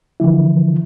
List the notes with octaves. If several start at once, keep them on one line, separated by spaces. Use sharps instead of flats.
D3 E3 F3 E4